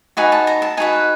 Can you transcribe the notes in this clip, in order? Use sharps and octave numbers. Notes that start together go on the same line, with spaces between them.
D#4 F#4 B4 G#5
A5
A#5
A5
D#4 F#4 B4 G#5